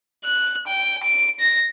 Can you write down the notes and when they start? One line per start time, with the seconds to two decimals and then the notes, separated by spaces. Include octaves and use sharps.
0.25 F#6
0.67 G5
1.04 D7
1.40 A#6